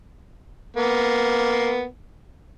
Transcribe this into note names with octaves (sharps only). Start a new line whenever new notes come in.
A#3 B3